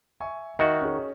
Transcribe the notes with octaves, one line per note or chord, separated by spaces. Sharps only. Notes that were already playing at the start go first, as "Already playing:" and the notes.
E5 G#5 C#6
D#3 F#4 D#5 E5
C#4 G#4